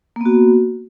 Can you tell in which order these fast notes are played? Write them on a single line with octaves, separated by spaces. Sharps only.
A#3 B3 F#4